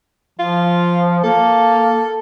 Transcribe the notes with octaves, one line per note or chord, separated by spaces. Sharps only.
F3 F4
A#3 A4